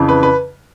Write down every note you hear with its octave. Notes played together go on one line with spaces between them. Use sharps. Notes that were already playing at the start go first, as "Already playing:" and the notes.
Already playing: F2 C#3 E3
B4
B4